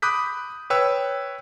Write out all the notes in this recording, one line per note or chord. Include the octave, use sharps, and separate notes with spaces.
B5 D6 D#6 F#6 G6 B6
B4 C#5 G5 E6